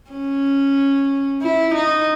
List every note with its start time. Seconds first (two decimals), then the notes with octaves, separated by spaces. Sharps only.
0.11 C#4
1.42 E4
1.75 D#4